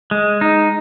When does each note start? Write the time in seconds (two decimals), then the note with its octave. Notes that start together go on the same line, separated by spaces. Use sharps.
0.11 G#3
0.41 D#4